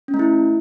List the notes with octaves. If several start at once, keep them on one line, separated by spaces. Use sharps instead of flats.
C#4
A3
E4